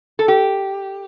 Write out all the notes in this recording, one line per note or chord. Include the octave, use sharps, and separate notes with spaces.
A4
G4